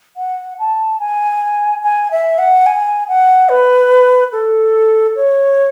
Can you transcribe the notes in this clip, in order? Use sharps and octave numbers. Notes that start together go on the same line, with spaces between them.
F#5
A5
G#5
G#5
E5
F#5
G#5
F#5
B4
A4
C#5